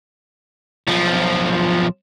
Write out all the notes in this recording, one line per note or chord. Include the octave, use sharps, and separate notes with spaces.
B1 F3